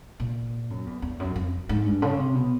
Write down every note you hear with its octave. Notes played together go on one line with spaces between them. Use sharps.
A#2
F#2
E2
E2
F#2
F2
G#2
G2
C#3
C3
B2